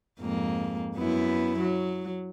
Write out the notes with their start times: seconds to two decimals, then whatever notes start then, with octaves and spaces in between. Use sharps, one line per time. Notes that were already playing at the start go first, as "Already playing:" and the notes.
0.20 F2 G#2 A#3
0.95 F#2 B3 E4
1.59 F#3